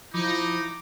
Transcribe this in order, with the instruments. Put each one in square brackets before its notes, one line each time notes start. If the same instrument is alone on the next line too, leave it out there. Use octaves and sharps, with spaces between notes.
[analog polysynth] F3 [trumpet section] D#4 [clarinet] E4 [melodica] D6